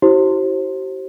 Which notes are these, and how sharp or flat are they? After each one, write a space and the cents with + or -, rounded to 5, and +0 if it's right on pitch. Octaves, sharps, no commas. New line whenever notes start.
E4 +0 G4 -45 C5 +25